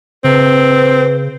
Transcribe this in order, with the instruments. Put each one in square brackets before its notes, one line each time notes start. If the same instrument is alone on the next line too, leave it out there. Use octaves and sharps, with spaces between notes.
[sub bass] C#3 [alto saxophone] C4 [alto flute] B4